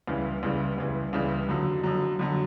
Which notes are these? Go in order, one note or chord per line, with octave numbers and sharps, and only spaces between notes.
C#2 C#3 E3 G3
C#2 C#3 E3 G3
C#2 C#3 E3 G3
C#2 C#3 E3 G3
F2 D3 F#3
F2 D3 F#3
F2 D3 F#3